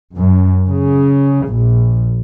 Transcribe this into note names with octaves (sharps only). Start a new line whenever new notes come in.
F#2
C#3
A#1